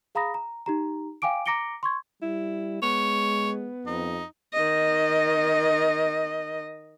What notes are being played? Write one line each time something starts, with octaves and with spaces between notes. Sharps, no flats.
G#4 F5 A#5 B5 D#6 A#6
A#5
D#4 G4 A#5
F5 G5 G#5 D6 D7
A#5 D6 A#6 C#7 D7 G7
C6 C#6 G#6
G3 E4
G#3 B3 C#5
F2 D#4
D#3 D#5